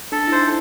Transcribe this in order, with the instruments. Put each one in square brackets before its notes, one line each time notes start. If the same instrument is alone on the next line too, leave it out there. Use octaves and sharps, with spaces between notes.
[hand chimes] D4 [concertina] A4
[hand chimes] E4
[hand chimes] D#4 [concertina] C5